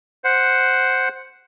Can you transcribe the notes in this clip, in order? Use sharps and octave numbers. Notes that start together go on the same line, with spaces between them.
C5 F#5